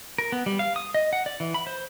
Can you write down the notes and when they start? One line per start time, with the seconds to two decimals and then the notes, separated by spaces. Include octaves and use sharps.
0.18 A#4
0.32 B3
0.46 G3
0.59 F5
0.76 D#6
0.94 D#5
1.13 F#5
1.26 D5
1.40 E3
1.54 B5
1.67 C5